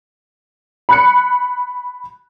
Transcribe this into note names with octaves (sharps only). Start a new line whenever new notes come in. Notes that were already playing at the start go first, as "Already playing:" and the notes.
B5 F#6 C#7